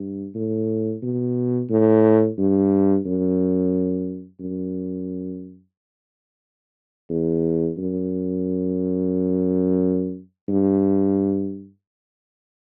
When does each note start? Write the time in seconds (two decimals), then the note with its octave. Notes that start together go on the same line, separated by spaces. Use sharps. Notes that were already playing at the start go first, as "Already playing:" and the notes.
Already playing: G2
0.35 A2
1.03 B2
1.70 A2
2.38 G2
3.05 F#2
4.40 F#2
7.10 E2
7.78 F#2
10.49 G2